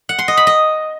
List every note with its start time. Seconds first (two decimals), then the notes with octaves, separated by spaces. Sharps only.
0.09 F#5
0.19 C6
0.28 D#5
0.37 B5
0.47 D#5